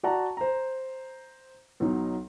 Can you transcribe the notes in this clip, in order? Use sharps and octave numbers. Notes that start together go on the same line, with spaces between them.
F#4 D5 F#5 A5 A#5
C5 A#5
B1 F#3 D#4